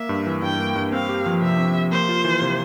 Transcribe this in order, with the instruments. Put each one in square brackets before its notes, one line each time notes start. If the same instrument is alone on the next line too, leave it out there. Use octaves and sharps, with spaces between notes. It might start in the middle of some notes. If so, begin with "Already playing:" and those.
Already playing: [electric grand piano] A#3 [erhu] E5
[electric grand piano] G2
E3
[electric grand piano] G2 [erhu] G5
[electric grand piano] A#3
G2
[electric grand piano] C4 [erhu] F5
[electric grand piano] G4
F3
[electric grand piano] C3 [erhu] E5
[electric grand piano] C4
G4
[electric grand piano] A#3 [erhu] C5
[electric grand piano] F4
E3
C3